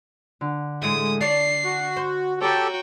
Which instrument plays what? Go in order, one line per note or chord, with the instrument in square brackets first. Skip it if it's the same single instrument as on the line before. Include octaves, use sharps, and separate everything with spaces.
[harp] D3
[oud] A2 E3 G#3 [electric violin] D#6
[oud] D4 C#5 D5 [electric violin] C7
[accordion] F#4
[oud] C5
[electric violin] F#4 G5 [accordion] G4 A4 A5 [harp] C#5 A#5